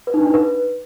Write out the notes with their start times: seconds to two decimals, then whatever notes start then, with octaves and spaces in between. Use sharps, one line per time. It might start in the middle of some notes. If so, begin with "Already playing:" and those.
0.07 B4
0.14 D#4
0.21 D4
0.27 D#4
0.34 B4